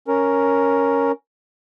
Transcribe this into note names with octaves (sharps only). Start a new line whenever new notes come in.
C#4 A#4